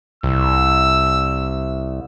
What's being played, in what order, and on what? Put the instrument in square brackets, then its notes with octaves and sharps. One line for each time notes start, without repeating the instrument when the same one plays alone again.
[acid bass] C2 [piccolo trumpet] E6